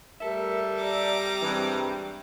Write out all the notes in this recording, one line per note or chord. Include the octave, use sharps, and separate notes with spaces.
G3 A3 G4 A4 A#4 E5
G4 D5 A#5 D6
G2 E3 G#3 C4